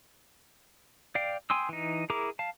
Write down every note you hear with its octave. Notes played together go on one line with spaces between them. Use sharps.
D5 F5 G5
G5 G#5 C6 D#6 E6
E3 D#4
E4 G#4 A#4 A#5 D6
F5 A5